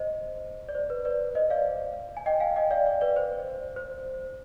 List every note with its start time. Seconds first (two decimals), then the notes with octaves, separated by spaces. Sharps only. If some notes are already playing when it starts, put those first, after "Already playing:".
Already playing: C5 D#5
0.69 D5
0.75 C5
0.90 B4
1.05 B4 D5
1.35 C5 D#5
1.50 D5 F5
2.17 G#5
2.26 D#5 G5
2.40 F5 G#5
2.56 D#5 G5
2.71 D5 F5
2.86 D5 F5
3.01 B4 D5
3.16 C5
3.76 C5